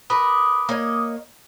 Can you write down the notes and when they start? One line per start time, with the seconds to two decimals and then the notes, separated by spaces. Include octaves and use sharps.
0.10 A#4 B4 D6 D#6
0.69 A#3 C#5 D#5